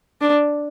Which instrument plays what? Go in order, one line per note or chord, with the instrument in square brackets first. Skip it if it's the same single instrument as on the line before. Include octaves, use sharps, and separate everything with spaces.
[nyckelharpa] D4